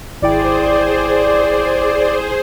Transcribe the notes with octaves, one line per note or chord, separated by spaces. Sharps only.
G#1 E4 G#4 C5 D5 G5